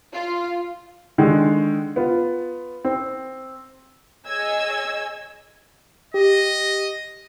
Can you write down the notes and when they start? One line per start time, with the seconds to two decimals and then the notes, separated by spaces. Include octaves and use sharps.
0.14 F4
1.18 D3 D#3 G#3
1.96 B3 F4
2.85 C4
4.28 G#4 C#5 D#5 G#5 E6 G#6
6.14 G4 D#5